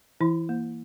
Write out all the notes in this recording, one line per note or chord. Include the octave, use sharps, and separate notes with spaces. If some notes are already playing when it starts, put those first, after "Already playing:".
E3 E4
A#3